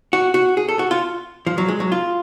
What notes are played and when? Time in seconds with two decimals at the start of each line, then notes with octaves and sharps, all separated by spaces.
0.13 F#4
0.34 F#4
0.57 G#4
0.69 A4
0.79 F#4
0.91 F4
1.47 F3
1.58 F#3
1.68 G#3
1.80 F#3
1.92 F4